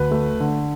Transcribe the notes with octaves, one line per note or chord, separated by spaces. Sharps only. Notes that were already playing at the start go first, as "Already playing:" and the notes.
Already playing: D2 B4
A3
D3